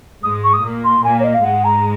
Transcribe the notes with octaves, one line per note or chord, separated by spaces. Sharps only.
G#2 G#3 D#6
C#6
D#6
A#2 A#3
C6
A#2 A#3 G#5
C#5
D#5
F5
G#2 G#3 F#5
A#5